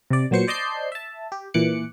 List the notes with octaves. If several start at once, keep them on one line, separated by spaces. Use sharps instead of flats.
C3 D5
A#2 F#3 B3 C5 C#6 C#7
C5 D5 D#5 A5 G6 C7
E5 A5
G4
A#2 E3 D6 F#6 C#7